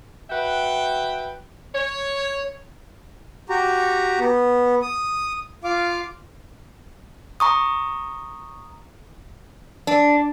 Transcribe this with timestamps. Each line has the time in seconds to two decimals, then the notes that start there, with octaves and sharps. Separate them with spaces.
0.30 F#4 B4 E5 G5
1.75 C#5
3.49 F#4 G4 A#5
4.20 B3
4.82 D#6
5.64 F4 F5 D6
7.40 A#5 C#6 D#6
9.87 D4